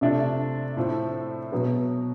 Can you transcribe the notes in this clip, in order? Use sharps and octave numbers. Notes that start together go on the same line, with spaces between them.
C3 F3 A3 D4
A2 F3 A3 C4
B2 F#3 B3